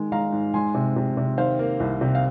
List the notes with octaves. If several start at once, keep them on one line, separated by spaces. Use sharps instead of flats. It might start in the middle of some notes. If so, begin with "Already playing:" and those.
Already playing: D#3 G#3
G#3 F5 A#5
G#2
G#3 G#5 C6
C3
C3
C3
D#3 C5 F5
A#3
C2
C3
F5